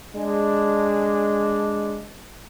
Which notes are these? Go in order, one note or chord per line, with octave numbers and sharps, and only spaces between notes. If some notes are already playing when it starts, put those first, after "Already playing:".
G#3 D4